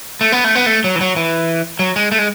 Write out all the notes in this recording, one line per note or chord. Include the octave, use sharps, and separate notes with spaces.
A3
B3
A3
B3
A3
F#3
E3
F#3
E3
F#3
G#3
A3
G#3